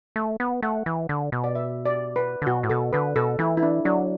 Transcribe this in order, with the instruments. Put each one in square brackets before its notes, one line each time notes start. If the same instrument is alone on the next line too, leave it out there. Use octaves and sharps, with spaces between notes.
[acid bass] A3
B3
[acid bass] A3 [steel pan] F#5
[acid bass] E3
D3
B2
[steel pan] D5
E5
D5
B4
[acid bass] D3
[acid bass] B2 [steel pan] F#4
[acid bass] A2
[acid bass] B2 [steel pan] A4
[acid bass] D3 [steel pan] B4
[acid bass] B2 [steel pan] A4
[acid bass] E3 [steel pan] E4
[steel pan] E4
D4
[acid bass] F#3 [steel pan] D4